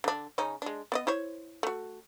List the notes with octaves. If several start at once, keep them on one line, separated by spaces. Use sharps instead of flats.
D3 D4
C#3 C#4 D#4
G#3 D4
B3 D5 D#5
E4 C5 C#5
A3 F#4